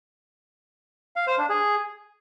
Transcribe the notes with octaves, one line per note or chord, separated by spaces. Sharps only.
F5
C5
D4
G#4